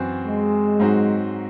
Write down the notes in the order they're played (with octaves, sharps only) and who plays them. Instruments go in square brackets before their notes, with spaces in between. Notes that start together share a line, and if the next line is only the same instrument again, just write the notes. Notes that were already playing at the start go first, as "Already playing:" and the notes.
Already playing: [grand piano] F#2 E3 C4 F#4
[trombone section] G#3
[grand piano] G#2 F#3 C4 D#4 F#4